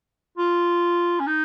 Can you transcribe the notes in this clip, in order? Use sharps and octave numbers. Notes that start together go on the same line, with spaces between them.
F4
C#4
D#4